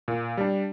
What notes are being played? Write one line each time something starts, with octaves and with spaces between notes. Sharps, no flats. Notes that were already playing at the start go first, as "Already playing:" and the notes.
A#2
G3 D4